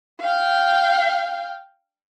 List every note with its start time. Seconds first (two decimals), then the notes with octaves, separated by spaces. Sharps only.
0.20 F5 G5